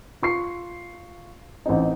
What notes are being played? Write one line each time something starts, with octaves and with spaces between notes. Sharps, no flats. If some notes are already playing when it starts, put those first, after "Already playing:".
F4 C#6 C7
A1 C4 D#4